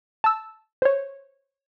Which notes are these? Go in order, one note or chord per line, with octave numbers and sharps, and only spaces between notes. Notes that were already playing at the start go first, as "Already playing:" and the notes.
A5 E6
C5 C#5